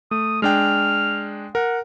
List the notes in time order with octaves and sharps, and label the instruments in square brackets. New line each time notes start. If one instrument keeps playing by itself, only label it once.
[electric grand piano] A3 [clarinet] D#6
[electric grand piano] G#3 D4 G5 [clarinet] F6
[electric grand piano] A#4 [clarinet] F#5